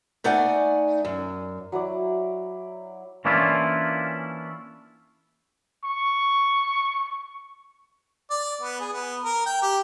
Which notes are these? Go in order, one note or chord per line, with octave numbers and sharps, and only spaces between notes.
A3 D#4 D5 F#5 G#5
F#2
F#3 E4 D5
E3 A#3 C#4 D4 E4 F4
C#6
D5
B3
G#4
B3
A#4
G5
G4